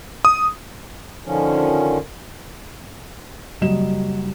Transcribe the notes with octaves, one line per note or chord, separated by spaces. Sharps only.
D#6
D3 D#3 F3 C#4
F#1 F#3 G3 D#5 E7